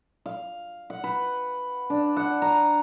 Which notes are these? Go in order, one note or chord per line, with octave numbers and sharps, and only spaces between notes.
F5
F#5
B4
D4
F#5
A#5